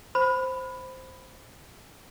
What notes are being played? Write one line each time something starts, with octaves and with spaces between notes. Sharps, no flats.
C5 B5